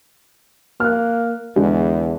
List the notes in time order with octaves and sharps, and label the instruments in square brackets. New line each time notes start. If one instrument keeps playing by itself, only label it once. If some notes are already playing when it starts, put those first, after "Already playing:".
[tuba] A#3 [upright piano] F6 F#6
[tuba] E2 [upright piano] D3 G#3